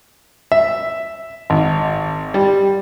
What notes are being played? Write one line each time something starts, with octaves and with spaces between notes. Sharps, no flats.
E5
G#1
G3